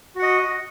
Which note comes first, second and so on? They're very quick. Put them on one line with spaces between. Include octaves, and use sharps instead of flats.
F#4 F#5 D#5